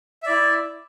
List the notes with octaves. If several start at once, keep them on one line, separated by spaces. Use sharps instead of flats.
E4 D5 E5